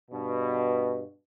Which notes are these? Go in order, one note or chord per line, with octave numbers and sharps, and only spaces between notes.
G2 B2